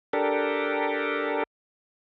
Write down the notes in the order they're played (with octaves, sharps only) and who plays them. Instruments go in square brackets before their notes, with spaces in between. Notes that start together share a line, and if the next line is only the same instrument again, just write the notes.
[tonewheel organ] D4 G4 A4 A#4